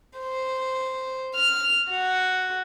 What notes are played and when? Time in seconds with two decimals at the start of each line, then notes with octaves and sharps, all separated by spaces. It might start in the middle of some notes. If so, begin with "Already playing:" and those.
0.19 C5
1.36 F6
1.90 F#4